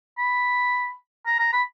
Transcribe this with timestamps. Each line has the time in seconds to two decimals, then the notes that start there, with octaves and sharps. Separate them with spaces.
0.18 B5
1.26 A#5
1.39 A#5
1.53 B5